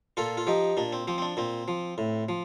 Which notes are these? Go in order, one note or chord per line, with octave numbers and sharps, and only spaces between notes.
A#2 F4 A4
F4
F3 D#4 G4
A#2 D4
C4
F3 C4
C4
D4
A#2 C4
F3
A2
F3